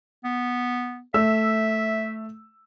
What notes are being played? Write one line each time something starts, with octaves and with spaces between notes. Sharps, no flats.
B3
A3 E5 E6